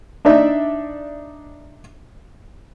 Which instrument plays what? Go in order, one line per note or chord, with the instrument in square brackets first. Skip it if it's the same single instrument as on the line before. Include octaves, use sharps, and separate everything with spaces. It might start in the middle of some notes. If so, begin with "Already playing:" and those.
[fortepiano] D4 D#4 D5 E5